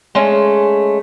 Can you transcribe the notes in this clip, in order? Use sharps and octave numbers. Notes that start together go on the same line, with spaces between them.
G#3 A3 C#4